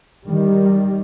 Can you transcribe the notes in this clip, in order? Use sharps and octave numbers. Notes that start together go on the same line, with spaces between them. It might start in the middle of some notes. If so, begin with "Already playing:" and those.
D#3 G3